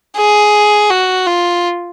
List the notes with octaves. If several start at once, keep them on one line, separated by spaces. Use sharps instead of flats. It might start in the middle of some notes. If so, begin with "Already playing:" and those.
G#4
F#4
F4